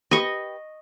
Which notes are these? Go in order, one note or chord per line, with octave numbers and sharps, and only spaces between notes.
G4 B4 D#5 C#6